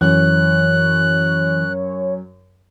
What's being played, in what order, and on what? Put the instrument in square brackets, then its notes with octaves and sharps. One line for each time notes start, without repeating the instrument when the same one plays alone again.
[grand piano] F#2 [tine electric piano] E3 [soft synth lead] C#5 [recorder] F#6